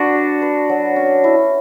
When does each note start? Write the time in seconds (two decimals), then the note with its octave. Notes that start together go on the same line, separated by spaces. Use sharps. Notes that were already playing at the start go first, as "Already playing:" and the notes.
Already playing: D4 F#4 B4
0.14 D5
0.42 B4
0.69 F#3
0.96 C#4
1.24 E4